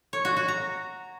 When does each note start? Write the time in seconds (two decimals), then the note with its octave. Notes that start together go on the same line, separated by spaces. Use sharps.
0.13 C#5
0.25 F#4
0.37 F#4
0.48 A#5